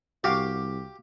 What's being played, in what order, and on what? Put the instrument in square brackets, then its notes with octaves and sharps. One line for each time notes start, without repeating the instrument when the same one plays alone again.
[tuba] C2 [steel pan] F#4 F5 D6 [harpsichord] G4